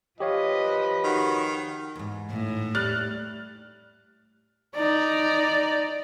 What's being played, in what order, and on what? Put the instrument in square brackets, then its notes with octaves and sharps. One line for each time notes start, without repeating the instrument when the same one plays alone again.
[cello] F3 B4 [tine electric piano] G4 C#5 F5 [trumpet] D#5
[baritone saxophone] D#3 [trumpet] F#4
[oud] E2 G#2
[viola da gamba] A2
[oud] G3 [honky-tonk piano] F6 F#6 A6
[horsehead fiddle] D#4 D5